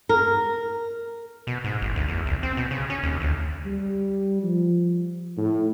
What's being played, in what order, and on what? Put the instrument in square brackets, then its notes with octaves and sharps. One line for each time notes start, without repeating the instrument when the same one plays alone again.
[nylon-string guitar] A#4
[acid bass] B2
G#2
A1
D2
E2
C2
C4
B2
C#3
C#4
D#2
D2
[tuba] G3
F3
A2